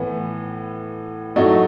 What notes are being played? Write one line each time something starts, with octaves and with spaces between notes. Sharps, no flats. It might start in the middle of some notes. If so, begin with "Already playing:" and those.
Already playing: A2 E3 B3
A2 F#3 A3 D#4 F#4